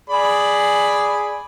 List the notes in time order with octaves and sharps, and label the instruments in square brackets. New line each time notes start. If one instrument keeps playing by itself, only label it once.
[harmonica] G#4 D5 B5